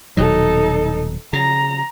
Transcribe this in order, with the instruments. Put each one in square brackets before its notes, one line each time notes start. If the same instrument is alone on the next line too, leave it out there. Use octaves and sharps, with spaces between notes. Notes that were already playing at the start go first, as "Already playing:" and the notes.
[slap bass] D#1 B2 F#3 [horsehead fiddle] D#4 A4
[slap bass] C#3 [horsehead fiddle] A#5